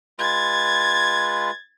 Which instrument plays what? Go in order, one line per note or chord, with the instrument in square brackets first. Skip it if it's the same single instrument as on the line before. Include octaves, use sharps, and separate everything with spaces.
[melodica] G#3 F4 B4 [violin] G#6 A6